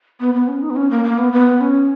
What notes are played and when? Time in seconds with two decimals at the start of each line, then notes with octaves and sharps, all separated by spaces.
0.20 B3
0.34 B3
0.48 C#4
0.62 D#4
0.70 B3
0.76 C#4
0.90 A#3
1.04 A#3
1.18 B3
1.33 B3
1.61 C#4